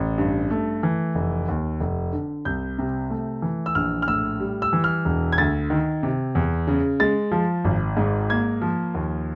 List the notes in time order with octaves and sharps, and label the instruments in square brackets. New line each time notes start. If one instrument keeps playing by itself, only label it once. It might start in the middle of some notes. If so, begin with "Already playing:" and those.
Already playing: [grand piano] A1
G2
A3
E3
F1
D#2
F1
D3
C2 G6
C3
A3
E3
E6
A#1 F6
F6
A2 E6
G3
E6
E3
F6
E1
G#6
D2 A6
D#3
C3
E2
C#3
G#3 A6
F3
G#1
G#2
A#3 G#6
F3
D#2